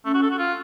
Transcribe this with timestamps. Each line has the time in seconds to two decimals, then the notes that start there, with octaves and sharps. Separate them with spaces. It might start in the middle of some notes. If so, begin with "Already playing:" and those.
0.05 A3 C#4
0.14 F#4
0.22 A4
0.30 F#4
0.39 F4